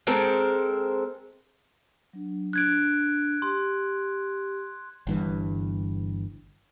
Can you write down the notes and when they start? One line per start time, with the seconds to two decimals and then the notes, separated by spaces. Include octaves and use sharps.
0.07 G#3 C4 A4 A#4
2.13 F#3 D4
2.53 D4 F#6 G#6 D7
3.42 G4 C6
5.07 G1 G2 E3